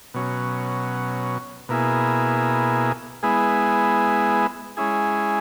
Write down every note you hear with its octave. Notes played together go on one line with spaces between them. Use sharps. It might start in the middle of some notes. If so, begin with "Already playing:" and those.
B2 F#3 C#4
B2 A#3 E4 G#4
G#3 B3 E4 G#4
G#3 C#4 E4 G#4